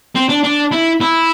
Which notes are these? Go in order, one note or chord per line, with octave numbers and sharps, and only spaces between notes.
C4
D4
D4
E4
E4